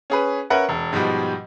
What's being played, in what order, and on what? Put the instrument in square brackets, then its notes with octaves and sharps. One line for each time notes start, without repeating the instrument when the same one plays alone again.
[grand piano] C#4 G#4 B4
C#4 A#4 B4 E5 F#5
E1
G#2 B2 F3 G3